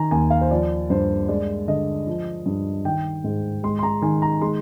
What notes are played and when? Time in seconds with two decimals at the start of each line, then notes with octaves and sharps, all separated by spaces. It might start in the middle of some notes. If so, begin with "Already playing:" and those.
Already playing: D#3 G#5 A#5
0.11 D#2 G#5
0.30 F5
0.41 C5
0.51 F3 D5
0.90 G2 C5
1.28 G#3 D5
1.68 D3 D#5
2.07 F3
2.46 G2
2.85 D#3 G5
3.24 G#2
3.63 G#3 C6
3.79 C6
3.83 A#5
4.02 D#3 G#5
4.22 A#5
4.41 G#3 C6